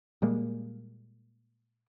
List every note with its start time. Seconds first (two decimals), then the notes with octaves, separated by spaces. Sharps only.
0.22 A#2 G3 G#3 A#3